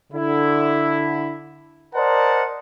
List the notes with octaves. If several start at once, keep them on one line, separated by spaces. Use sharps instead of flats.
D3 E4
A#4 C5 D5 D#5 F#5 A5